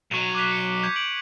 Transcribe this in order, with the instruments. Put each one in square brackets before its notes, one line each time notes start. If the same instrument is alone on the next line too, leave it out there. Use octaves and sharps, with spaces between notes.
[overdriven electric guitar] B1 F#3 [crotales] C#6 D#7 F7
[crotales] D6 F#6 B6
C#7
G6 G#6 B6
D7 F#7